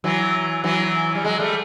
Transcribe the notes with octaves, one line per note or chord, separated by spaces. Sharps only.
E3 F#3
E3 F#3
G3
F#3 G#3
G3 A3